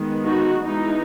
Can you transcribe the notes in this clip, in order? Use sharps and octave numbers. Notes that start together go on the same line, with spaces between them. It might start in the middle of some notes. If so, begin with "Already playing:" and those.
Already playing: D#3 G#3 B3
D#4 F#4
E3 G#3 B3 D#4